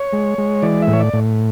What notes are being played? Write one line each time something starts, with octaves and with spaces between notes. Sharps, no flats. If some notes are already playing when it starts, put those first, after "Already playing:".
Already playing: C#5
G#3
G#3
E3 D5
E5
A2
C#5
D5
A2